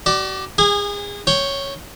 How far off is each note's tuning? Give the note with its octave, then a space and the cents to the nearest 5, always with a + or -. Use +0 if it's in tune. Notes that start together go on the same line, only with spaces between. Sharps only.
F#4 +45 D5 +10
G#4 -30 G#5 -15
C#5 +0 G5 +0